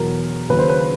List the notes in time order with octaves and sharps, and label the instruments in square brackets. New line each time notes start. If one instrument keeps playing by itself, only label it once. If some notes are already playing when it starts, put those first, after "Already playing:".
Already playing: [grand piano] E2 B2 F#3 A#4
D#2 C#3 F#3 B4
C5
B4